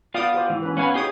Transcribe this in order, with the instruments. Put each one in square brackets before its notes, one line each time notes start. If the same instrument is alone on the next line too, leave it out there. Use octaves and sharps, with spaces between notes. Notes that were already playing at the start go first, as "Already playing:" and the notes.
[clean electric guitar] B3 F4 F5 [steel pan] D5 G5 D#6
[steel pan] G4 C5
[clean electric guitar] G#2 E3
[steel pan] C#4 B4
[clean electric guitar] B3 C#4 B4 [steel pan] C#5 F5 G#5
[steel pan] D#4 C#5 D#6 [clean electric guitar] G4 G#4 G5